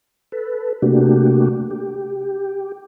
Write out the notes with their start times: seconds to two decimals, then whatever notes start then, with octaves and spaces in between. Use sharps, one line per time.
0.32 A4 B4
0.82 C3 A3 A#3 D4 F#4 G4
1.71 G4